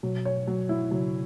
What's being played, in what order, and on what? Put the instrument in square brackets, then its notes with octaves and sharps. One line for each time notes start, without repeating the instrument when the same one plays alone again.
[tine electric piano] B2 [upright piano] F#3
[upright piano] C#5
F#3
E4
[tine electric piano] C#3 [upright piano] F#3